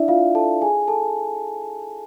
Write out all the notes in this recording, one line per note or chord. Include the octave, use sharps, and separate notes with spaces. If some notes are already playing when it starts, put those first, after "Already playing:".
Already playing: D4 E4 D5 E5
F4 F5
A4 A5
G#4 G#5
A4 A5